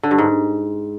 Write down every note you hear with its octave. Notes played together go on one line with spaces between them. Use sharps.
D3
G2
G#2